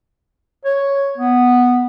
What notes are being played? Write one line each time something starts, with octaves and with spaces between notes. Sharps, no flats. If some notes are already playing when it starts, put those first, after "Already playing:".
C#5
B3